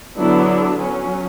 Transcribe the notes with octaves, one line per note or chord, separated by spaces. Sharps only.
D3 F#3 B3 D4 E4
F#3 C#4